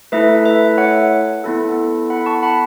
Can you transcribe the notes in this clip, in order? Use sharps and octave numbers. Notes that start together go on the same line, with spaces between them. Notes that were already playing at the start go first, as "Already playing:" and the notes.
A3 E4 A4 B4 E5
B4 E5
C#5 F#5
B3 E4 A4
F#5 B5
A5 C#6
F#5 B5